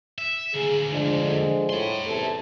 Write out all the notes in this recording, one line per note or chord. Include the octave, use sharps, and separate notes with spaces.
E5
D2 A#3 G#4
F3 G#3 D4
D3
A2 D#4 C6
A1 E2 C3 A4